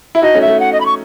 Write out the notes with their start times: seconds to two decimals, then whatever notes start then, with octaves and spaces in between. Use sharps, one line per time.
0.15 E4 E5
0.22 D#4 F#4 D#5
0.35 A3 C#4
0.41 E5
0.48 A3
0.60 F#5
0.73 D#5
0.80 B5
0.85 C#6